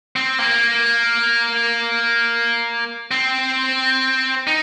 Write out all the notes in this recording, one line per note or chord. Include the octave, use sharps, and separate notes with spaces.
C4
A#3
C4
D#4